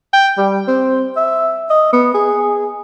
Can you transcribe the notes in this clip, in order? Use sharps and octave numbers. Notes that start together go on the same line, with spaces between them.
G5
G3
C4
E5
D#5
B3
G#4